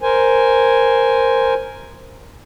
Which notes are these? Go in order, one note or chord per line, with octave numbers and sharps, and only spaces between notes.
A#4 C5 G#5